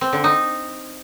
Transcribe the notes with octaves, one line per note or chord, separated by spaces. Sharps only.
C4
D3
D#4